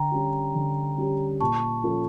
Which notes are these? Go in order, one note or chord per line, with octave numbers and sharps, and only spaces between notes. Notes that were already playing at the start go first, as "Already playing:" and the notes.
Already playing: D3 G5 A#5
G3 C#4 G4
D3
G3 C#4 G4
A#2 A5 C#6
F3 C#4 F4 A4